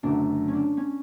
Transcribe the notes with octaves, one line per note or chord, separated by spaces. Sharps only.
F#1 F#2 D3 F#3 A3 D4
C#4
D4
C#4